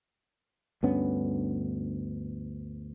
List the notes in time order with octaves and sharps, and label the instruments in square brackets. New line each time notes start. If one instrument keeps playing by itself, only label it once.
[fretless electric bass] D2 G2 B3 C#4